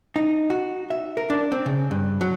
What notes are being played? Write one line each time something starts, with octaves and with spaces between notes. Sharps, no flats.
D#4
F#4
E5
A#4
D4
C4
C#3
G2
F#3